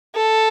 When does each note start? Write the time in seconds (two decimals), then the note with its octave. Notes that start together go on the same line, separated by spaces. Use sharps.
0.15 A4